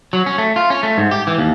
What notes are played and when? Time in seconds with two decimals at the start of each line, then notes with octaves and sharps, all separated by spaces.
0.13 F#3
0.26 C#4
0.38 A3
0.56 F4
0.70 C#4
0.83 A3
0.98 G#2
1.11 G4
1.27 E3
1.38 D#2